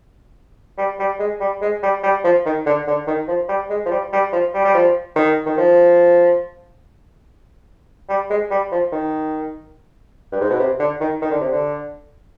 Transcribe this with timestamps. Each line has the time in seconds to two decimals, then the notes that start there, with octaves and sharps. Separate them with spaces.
0.78 G3
0.99 G3
1.19 G#3
1.40 G3
1.61 G#3
1.83 G3
2.03 G3
2.24 F3
2.46 D#3
2.66 D3
2.87 D3
3.07 D#3
3.28 F3
3.49 G3
3.70 G#3
3.86 F3
3.91 G3
4.12 G3
4.33 F3
4.54 G3
4.64 G3
4.74 F3
5.16 D#3
5.46 D#3
5.57 F3
8.09 G3
8.30 G#3
8.50 G3
8.72 F3
8.92 D#3
10.32 G2
10.41 G#2
10.50 B2
10.60 C3
10.80 D3
11.01 D#3
11.22 D#3
11.31 D3
11.41 C3
11.52 D3